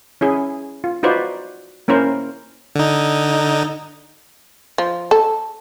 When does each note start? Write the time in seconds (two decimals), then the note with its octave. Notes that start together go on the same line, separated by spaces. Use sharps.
0.21 C#4 E4 G#4
0.84 F4
1.03 D#4 F4 F#4 B4 C5 D5
1.88 A#3 C#4 E4 A#4 C5
2.75 D3 D#4
4.78 F3
5.11 A4